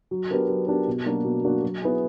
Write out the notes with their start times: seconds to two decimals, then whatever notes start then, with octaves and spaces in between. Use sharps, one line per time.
0.11 F#3
0.31 B3 D4 G4 A#4
0.49 F#3
0.68 B3 D4 G4 A#4
0.87 B2
1.06 F#3 A#3 D4 F#4
1.24 B2
1.44 F#3 A#3 D4 F#4
1.63 F#3
1.82 B3 E4 G#4